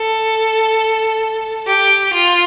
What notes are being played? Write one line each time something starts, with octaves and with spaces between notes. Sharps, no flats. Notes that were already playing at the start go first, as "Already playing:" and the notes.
Already playing: A4
G4
F4